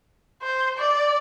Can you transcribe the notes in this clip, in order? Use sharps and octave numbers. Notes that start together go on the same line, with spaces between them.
C5
D5